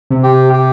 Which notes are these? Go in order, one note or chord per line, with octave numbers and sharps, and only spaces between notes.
C3
G4
G4